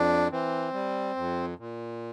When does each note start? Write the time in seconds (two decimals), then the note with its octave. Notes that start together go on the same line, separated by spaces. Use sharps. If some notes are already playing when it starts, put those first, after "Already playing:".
Already playing: F2 D4
0.31 E3 C4
0.74 G3
1.16 F2
1.59 A#2